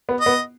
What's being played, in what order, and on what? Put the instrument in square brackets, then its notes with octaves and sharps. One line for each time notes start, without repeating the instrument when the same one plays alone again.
[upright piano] B3
[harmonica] D#5
[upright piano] B3